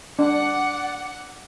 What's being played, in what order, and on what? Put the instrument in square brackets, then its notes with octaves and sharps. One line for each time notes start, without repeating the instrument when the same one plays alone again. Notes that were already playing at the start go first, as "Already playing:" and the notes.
[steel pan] D4 [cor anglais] D5 [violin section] F#5